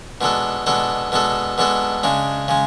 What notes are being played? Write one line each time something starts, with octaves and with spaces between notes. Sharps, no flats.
B2 G#3 D4 A4
B2 G#3 D4 A4
B2 G#3 D4 A4
B2 G#3 D4 A4
C#3 G#3 D4
C#3 G#3